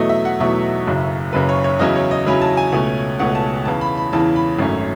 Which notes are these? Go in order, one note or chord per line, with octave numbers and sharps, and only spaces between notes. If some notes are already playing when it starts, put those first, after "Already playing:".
Already playing: E2 B2 F#3 A3 D#5
E5
F#5
E2 B2 F#3 A3 E5
F#1 F#2 C#3
F#1 F#2 C#3 B4
C#5
C#5
E2 C#3 F#3 C#4 E4 D#5
C#5
D#5
E2 C#3 F#3 C#4 E4 B5
A5
G#5
C#2 B2 A3 C#4
C#2 B2 A3 C#4 F#5
A5
E2 C#3 E3 A5
B5
B5
E2 C#3 E3 A5
B5
G#1 F#2 D#3 A3 C#4